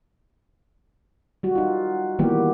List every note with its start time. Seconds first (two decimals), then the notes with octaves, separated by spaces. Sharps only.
1.43 G3 F#4
1.55 D#4 F4
2.19 D#3 E3 G3 A#3 B3 G4